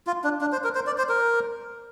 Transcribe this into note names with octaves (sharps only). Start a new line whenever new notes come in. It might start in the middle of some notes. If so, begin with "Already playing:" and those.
F4
D4
D4
C5
A#4
C5
D5
C5
A#4